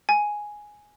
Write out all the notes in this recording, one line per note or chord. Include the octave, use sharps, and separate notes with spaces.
G#5